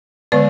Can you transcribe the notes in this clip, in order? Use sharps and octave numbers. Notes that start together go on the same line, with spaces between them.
D3 G#3 B3 B4 D5